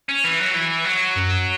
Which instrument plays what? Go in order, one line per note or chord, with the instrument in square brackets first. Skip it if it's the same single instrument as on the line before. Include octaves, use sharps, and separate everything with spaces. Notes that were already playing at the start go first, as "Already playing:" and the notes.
[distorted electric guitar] C#4
E3
F#3
E3
F#3
[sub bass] F#2